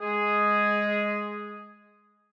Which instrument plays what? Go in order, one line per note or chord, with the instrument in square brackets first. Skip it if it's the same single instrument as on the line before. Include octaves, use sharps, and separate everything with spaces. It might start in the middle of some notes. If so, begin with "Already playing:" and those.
[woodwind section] G#3 G#4